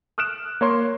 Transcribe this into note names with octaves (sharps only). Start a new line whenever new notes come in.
D#6 F6 F#6 D7 E7
A#3 C#5 C6